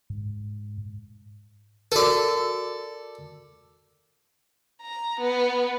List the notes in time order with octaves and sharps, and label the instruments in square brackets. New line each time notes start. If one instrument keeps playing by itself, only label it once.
[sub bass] G#2
[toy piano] F#4 A#4 [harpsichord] A4 D5
[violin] A#5
B3